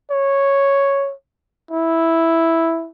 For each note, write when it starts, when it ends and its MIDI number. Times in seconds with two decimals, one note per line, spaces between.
0.11 1.13 73
1.71 2.89 64